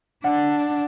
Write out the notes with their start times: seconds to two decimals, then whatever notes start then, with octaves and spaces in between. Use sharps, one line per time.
0.24 D4 F#5